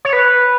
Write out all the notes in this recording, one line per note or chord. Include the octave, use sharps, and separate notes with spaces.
C#5
B4